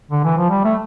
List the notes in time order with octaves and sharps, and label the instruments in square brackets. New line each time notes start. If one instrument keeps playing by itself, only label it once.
[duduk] D3
E3
F3
G3
A3